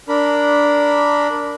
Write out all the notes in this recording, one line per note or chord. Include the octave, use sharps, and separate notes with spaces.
D4 A#4 B5